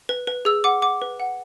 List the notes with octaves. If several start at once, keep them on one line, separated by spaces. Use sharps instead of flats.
B4
B4
G#4 E6
F#5 D6
F#5 D6
B4
F#5